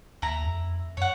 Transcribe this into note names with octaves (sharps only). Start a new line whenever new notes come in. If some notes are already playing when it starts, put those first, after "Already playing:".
D#2 E4 A#5
F2
F#2 C#5 F#5